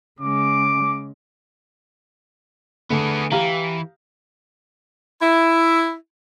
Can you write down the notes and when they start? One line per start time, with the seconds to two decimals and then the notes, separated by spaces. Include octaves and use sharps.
0.20 C#3 G#3 D6
2.90 D3 A3 B3 G#4
3.32 E3 G4 F5 A#5
5.22 E4